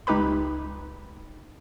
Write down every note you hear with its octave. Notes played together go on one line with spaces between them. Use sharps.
C#2 D#4 G4 B4 B5